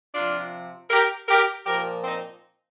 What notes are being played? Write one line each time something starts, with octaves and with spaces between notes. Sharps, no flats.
C3 F3 D4 F4
G4 A#4
G4 A#4
A#2 F3 G4 A#4
C4 D#4